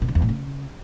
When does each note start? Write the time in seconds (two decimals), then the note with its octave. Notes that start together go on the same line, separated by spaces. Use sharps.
0.02 B2
0.08 D3
0.15 E2
0.22 A2
0.29 C#3